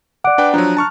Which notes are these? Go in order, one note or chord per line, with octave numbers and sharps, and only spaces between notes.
D5 F#5 D6 F#6 D7
D4 B4 G5
F3 F#3 D4 A#5 F#6
A5 C#6 F6